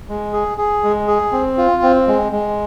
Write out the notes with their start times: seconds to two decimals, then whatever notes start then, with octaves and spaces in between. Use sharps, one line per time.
0.09 G#3
0.33 G#4
0.58 G#4
0.84 G#3
1.08 G#4
1.32 C4
1.57 F4
1.83 C4
2.07 G#3
2.32 G#3